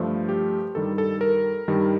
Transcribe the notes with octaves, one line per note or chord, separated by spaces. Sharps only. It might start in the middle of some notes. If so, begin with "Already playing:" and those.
Already playing: G2 F3 A3
G4
G2 D#3 G3 A4
A4
A#4
G2 D#3 G3